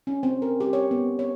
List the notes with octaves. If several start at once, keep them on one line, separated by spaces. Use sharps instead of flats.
C#4
C4
A#4
G4
C#5
B3
C#5